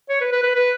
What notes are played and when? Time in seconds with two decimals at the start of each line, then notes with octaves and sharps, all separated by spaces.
0.09 C#5
0.21 B4
0.32 B4
0.43 B4
0.55 B4